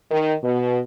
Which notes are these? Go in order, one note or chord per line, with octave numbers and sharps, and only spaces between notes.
D#3
B2